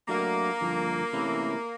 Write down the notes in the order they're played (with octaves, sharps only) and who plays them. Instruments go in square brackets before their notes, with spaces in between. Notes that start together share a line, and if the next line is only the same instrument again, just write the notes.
[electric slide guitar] F#3 A3 D4 F#4 [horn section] A#3
[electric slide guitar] G2 D3 F3
C3 E3 A3 C#4 E4